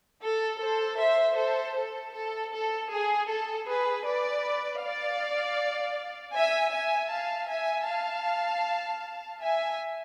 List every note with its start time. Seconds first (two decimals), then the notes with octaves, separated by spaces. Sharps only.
0.23 A4
0.61 A4 C5
1.00 C5 E5
1.38 A4 C5
1.77 A4
2.15 A4
2.53 A4
2.91 G#4
3.30 A4
3.68 G#4 B4
4.06 B4 D5
4.82 D5 F5
6.36 E5 G#5
6.73 E5 G#5
7.13 F5 A5
7.50 E5 G#5
7.88 F5 A5
9.41 E5 G#5